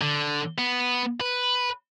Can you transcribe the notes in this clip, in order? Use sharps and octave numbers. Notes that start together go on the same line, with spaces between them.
D3
B3
B4